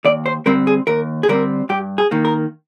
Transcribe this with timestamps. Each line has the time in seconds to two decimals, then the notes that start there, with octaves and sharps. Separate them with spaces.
0.05 D#2 D5
0.26 C5
0.46 D3 G3 C4 A#4
0.67 G#4
0.87 D#2 A#4
1.23 G#4
1.28 D3 G3 C4 A#4
1.69 G2 G4
1.98 G#4
2.11 D#3 A#3
2.25 A#4